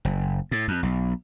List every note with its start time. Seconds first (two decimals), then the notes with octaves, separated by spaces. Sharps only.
0.05 F#1
0.51 A2
0.68 F2
0.83 B1